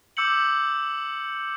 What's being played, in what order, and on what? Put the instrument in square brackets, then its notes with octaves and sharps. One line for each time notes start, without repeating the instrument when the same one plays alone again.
[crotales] D6 E6 G6 C#7 F#7